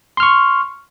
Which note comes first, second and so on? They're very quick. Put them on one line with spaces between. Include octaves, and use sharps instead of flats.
C6 F6 C#6